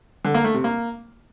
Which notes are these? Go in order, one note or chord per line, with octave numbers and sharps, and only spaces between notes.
D3
A#3
A3
C3
A#3